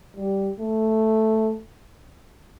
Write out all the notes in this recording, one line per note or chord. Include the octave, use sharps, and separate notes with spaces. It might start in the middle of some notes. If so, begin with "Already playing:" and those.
G3
A3